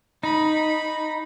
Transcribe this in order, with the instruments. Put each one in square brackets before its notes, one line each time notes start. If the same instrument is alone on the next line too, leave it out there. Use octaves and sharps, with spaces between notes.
[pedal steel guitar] D#4 [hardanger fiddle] B5